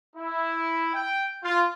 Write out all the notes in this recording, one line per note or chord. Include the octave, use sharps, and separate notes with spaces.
E4
G5
F4